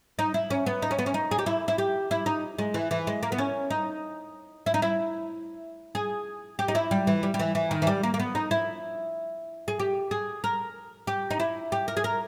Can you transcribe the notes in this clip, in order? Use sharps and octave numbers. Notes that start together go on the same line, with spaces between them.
D#4
E4
C#4
B3
D#4
C#4
B3
C#4
D#4
G#4
G4
E4
E4
G4
E4
D#4
G#3
E3
E3
G#3
A#3
B3
C#4
D#4
E4
D#4
E4
G#4
G4
D#4
E4
G3
E3
G3
G3
E3
E3
D#3
E3
G3
A#3
A#3
B3
D#4
E4
G#4
G4
G#4
A#4
G4
D#4
E4
G4
A#4
G#4
A#4